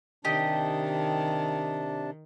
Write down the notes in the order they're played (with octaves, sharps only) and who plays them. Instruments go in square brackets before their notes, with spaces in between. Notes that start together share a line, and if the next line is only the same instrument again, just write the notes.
[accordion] C3 D4 A5 [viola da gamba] D#3 [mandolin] G4 D#5